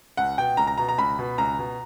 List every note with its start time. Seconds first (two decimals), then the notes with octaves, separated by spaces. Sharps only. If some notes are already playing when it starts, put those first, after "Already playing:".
0.17 C#2 F#5
0.38 B2 G5
0.57 C#2 A#5
0.67 A#5
0.78 B2 A#5
0.89 A#5
0.98 C#2 B5
1.19 B2
1.38 C#2 A#5
1.59 B2